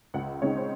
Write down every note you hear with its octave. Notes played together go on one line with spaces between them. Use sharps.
C#2 F#5
C#3 G#3 C4 D#4 C#5
C5